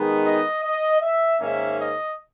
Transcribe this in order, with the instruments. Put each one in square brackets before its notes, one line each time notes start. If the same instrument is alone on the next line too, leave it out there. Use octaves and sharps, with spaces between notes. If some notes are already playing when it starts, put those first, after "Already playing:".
Already playing: [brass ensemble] D#3 G#3 B3 D#4
D#5
D#5
E5
G#2 D#3 A#3 C#4 E5
D#5